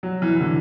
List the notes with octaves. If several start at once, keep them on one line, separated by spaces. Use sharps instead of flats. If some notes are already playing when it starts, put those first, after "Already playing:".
F#3
E3
D3